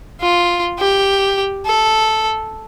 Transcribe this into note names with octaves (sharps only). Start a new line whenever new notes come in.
F4
G4
A4